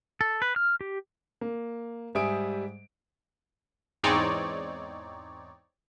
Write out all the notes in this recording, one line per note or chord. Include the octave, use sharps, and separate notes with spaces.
A4
B4
F6
G4
A#3
G#2 G3 E5 G#5 D#6 D7
E2 G#2 C4 D#4 C#5 D5